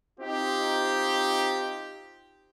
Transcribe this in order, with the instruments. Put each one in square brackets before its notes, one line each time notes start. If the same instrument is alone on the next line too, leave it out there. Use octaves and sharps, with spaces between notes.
[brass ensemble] C4 D#4 F4 G4